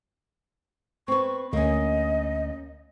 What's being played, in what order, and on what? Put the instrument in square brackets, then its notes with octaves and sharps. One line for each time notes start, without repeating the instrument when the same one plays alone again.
[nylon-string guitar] C4 B4 [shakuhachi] C#6
[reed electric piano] D2 [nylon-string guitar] A#3 C#4 [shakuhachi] D#5